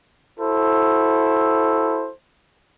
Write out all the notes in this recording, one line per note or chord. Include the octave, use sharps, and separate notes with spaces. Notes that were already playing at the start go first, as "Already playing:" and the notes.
E4 F#4 A4 C5